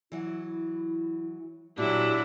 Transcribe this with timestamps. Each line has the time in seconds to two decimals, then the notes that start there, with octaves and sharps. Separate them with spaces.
0.12 E3 F#3 E4
1.78 A#2 F#3 D4 E4 G4